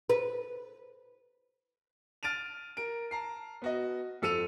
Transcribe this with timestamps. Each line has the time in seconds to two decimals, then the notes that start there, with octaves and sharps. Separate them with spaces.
0.10 B4
2.23 F6 A6 D7 D#7 F7
2.77 A#4 D7
3.11 A5 A#5 C7
3.62 B3 F#4 D#5
4.22 F2 A4 E6 C#7 D#7 F7